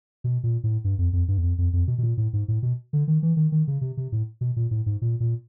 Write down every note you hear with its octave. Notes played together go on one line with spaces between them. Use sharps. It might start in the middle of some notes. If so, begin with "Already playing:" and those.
B2
A#2
A2
G2
F2
F2
G2
E2
F2
F2
F2
B2
B2
A#2
A2
G#2
A2
B2
D3
D#3
E3
D#3
D#3
C#3
C3
C3
A2
B2
A#2
A2
G#2
A#2
A#2